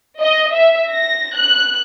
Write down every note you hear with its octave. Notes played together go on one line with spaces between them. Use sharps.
D#5
E5
A#6
F#6